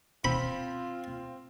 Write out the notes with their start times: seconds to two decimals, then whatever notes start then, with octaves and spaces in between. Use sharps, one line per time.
0.25 C4 F4 B5